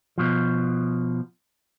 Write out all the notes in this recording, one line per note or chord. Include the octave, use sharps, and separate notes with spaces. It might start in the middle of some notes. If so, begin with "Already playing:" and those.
B2 F3